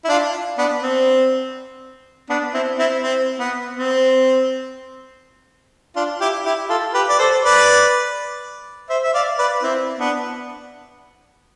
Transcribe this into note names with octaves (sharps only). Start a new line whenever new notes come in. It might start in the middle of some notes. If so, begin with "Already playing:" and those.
E4
D4 F4
B3 D4
C4
B3 D4
C4 E4
C4 E4
C4
B3
C4
D4 F4
E4 G4
E4 G4
F4 A4
G4 B4
D5
A4 C5
B4 D5
C5 E5
E5
D5 F5
B4 D5
C4 E4
B3 D4